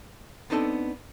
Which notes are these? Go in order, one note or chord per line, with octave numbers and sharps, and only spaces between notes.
B3 C4 D4 D#4 G#4 A4